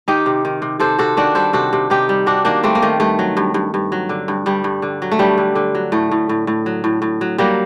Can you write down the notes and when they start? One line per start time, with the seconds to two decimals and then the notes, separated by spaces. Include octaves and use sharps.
0.08 D#3 D#4 G4
0.26 C3
0.45 D#3
0.62 C3
0.80 C3 A4 C5
0.98 C3 F#4 A4
1.17 D#3 D4 F#4
1.35 G3 A4 C5
1.53 C3 F#4 A4
1.73 C3
1.90 C3 D#4 G4
2.09 G3
2.26 C3 D4 F#4
2.45 D#3 A#3 D4
2.63 G3 A3 C4
2.75 A#3
2.82 D#3 A3
3.00 G2 A3
3.19 F#3
3.37 G2
3.54 G2
3.74 G2
3.92 F#3
4.09 D3
4.28 G2
4.46 G2 G3
4.64 G2
4.82 D3
5.02 F#3
5.11 A3
5.19 G2 G3
5.38 D3
5.55 D3
5.75 F#3
5.92 A2 A3
6.11 A2
6.29 A2
6.47 A2
6.66 F#3
6.84 A2
7.02 A2
7.21 F#3
7.38 F#3 G3 A#3